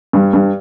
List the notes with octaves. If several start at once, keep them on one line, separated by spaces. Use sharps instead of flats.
G2
G2